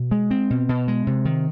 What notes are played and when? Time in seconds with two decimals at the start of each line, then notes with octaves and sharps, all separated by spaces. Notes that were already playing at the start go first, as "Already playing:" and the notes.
Already playing: B2
0.11 G#3
0.31 C4
0.50 B2
0.69 B2
0.88 G#3
1.07 C3
1.25 D#3